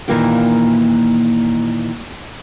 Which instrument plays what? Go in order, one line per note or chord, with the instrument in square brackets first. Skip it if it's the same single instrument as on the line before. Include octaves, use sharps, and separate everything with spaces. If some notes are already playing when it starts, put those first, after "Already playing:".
[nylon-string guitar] A#2 D#3 E3 A#3 F4 G5